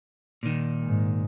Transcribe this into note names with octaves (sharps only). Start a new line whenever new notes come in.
A#2 D#3
G#2